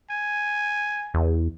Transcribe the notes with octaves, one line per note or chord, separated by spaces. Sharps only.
G#5
E2